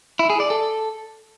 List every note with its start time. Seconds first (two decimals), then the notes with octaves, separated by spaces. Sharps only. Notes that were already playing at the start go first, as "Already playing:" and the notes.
0.19 E4
0.30 G#4
0.40 D5
0.50 A4